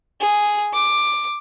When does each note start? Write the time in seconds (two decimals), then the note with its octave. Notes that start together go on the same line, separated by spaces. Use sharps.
0.21 G#4
0.73 D6